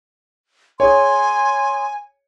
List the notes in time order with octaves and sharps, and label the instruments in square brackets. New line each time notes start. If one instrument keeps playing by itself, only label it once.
[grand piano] G#4 C#5 [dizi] G#5 [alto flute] C6